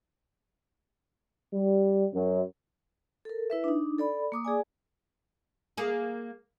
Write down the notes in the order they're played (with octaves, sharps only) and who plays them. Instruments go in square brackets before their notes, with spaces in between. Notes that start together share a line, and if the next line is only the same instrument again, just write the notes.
[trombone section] G3
F#2
[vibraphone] A4 A#4
E4 B4 E5
D4 D#4
A4 D5 B5
A#3 D6 D#6
G#4 D5 G#5
[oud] A#3 G#4